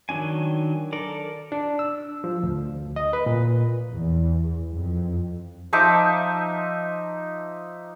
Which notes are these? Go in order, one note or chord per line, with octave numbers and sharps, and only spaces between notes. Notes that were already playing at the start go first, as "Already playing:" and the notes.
D#3 F#3 D4 G#5
A4 A#4 D5
D4
E6
F3
D2
D#5
B4
A#2
E2
F2
F3 D#4 E5 D6